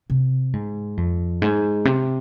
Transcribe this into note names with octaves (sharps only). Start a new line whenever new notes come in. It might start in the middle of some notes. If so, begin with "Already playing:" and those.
C3
G#2
F2
G#2
C3